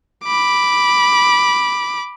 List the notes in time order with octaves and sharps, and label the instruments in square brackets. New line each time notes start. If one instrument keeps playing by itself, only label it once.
[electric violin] B5 D6